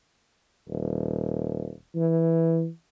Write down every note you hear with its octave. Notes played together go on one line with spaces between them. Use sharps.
D#1
E3